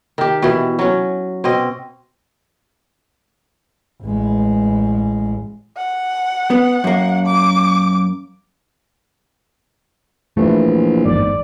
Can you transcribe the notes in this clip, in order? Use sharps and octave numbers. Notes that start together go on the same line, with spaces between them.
D#3 G4
B2 E3
F#3 C#4
B2 C4 D#5
A1 G#3
F#5
B3
F#2 A#3
D6
A#1 E3 A3
G1 E2 G#2 D5